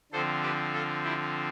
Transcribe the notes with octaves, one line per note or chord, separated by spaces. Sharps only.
D3 F3 C4 A4 C5
G4 B4
F4 A4
E4 G4